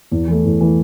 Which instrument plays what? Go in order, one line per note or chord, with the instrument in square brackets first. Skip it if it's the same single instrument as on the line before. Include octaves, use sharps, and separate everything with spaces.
[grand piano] E2
E3 A3
E2
E3 A3